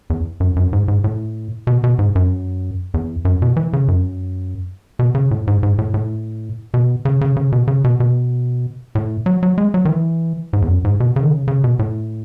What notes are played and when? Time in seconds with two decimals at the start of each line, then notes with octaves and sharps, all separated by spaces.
0.10 E2
0.40 F#2
0.56 F#2
0.73 G#2
0.88 G#2
1.04 A2
1.67 B2
1.84 B2
1.99 G#2
2.15 F#2
2.94 E2
3.25 F#2
3.42 B2
3.56 E3
3.73 C#3
3.88 F#2
4.99 B2
5.15 C#3
5.31 A2
5.47 G#2
5.63 G#2
5.78 A2
5.94 A2
6.74 B2
7.05 C#3
7.21 C#3
7.37 C#3
7.52 B2
7.68 C#3
7.84 B2
8.00 B2
8.95 A2
9.26 F#3
9.43 F#3
9.58 G#3
9.74 F#3
9.85 D#3
9.89 E3
10.53 G#2
10.62 E2
10.68 F#2
10.85 G#2
11.00 B2
11.16 C#3
11.22 D#3
11.31 C#3
11.48 C#3
11.64 B2
11.79 A2